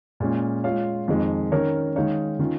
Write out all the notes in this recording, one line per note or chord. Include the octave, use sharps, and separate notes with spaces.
A#2 G#3 C#4
G#3 F4 C#5 F5
F2 D#3 G#3
D#3 C#4 A#4 C#5
D#3 G#3 D#4 C#5 F5
D#3 C#4 F4